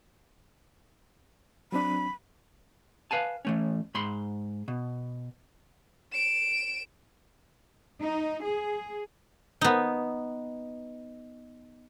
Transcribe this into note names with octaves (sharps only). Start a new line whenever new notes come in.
F#3 C4 D4 B5
B4 F5 G#5 A5
E3 A3 C#4
G#2 B5 C6
B2
D7 E7
D#4
G#4
B3 D#4